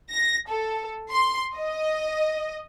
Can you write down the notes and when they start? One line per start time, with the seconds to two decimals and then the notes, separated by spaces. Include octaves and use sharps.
0.11 A#6
0.48 A4
1.11 C6
1.57 D#5